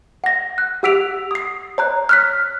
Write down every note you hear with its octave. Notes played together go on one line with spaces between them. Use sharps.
F#5 A#6
F#6
G4 F#5 E6 B6 D7 F7
D#6 C7
C#5 A#5 F#6
F6 F#6 B6